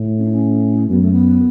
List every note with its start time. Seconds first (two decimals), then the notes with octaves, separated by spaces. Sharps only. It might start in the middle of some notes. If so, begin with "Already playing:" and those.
Already playing: A2
0.18 C#4
0.24 D4
0.31 C#4
0.89 F#2 B3
1.00 A3
1.12 B3